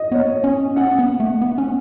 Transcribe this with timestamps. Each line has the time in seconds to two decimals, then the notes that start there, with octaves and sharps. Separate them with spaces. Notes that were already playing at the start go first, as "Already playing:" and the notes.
Already playing: D#5
0.12 B3 C#5
0.33 C#5
0.44 C#4
0.76 C#4 F#5
0.99 B3
1.20 A3
1.42 B3
1.58 C#4